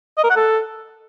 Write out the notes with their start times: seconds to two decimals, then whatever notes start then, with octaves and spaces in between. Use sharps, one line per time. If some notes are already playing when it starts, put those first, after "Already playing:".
0.17 D#5
0.24 A#4
0.30 F#5
0.36 A4